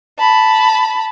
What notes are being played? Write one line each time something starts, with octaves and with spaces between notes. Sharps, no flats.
A5 B5